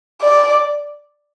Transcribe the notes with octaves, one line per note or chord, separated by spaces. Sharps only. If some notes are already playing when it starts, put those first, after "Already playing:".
D5